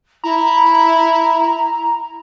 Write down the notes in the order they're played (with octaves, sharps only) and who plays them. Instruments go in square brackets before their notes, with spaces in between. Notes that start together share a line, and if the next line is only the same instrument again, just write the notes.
[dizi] E4 [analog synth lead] A#5